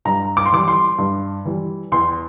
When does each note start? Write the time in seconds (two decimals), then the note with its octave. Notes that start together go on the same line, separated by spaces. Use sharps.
0.05 G2 A#5
0.37 D6
0.46 C6
0.52 E3 G3 D6
0.68 C6
0.98 G2
1.45 E3 G3
1.92 E2 C6